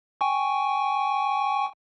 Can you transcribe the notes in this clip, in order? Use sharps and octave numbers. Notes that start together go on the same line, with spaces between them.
G5 G#5 C#6